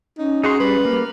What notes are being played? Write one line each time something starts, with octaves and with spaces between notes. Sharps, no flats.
C#4 D#4
D#4 F#4 G#4 C6
G3 B4
A#3 F6